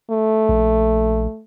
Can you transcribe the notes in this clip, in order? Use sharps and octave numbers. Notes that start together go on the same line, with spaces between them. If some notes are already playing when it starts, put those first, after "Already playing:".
A3
A#1